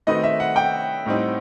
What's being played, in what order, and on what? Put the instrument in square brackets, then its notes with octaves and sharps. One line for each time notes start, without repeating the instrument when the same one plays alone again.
[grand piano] D#3 A3 C4 F#4 B4 [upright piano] D#5
[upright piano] E5
F#5
G5
[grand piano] A2 G3 C4 D#4